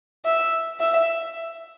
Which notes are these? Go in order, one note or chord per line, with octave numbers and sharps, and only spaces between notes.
E5
E5